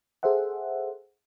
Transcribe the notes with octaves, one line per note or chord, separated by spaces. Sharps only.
G#4 A4 C5 E5 F#5